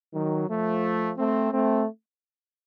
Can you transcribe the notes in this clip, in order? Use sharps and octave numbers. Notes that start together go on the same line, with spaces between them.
D#3 F#3
F3 A3
A3 C4
A3 C4